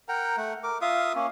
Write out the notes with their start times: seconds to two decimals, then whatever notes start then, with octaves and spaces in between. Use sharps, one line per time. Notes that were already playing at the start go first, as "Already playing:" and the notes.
0.09 A#4 F#5 G5 A#5
0.37 A3 F#5
0.63 A#4 D6
0.81 F4 E5 F5 D#6
1.15 A#3 C#4